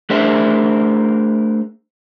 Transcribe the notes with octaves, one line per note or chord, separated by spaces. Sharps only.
A3 D4 G#4 A#4 C5 E5